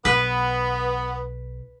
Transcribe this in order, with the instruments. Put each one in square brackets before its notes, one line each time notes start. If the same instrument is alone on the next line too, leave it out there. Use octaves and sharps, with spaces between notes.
[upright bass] B1 [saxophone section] B3 [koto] B4